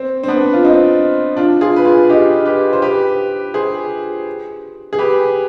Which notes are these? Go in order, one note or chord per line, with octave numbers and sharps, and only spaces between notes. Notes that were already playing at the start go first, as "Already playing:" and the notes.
Already playing: C4
C4
B3 D4
F4
C4 D#4
D4 F4
F4 G#4
B4
F4 G#4
D#4 G4
G4 B4
C5
G4 B4
G#4 C5
G#4
G4 B4